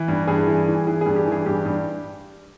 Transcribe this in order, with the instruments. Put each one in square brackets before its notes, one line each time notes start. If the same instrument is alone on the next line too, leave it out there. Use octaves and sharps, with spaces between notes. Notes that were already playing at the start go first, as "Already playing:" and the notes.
Already playing: [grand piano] E3
G2
G2 G#4
E3
E3
E3 G#4
G2 G#4
G4
E3
G#4
G2 G4
G2